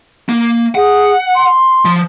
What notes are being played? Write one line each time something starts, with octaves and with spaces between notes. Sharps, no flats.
A#3
G#4 F#5
C6
F3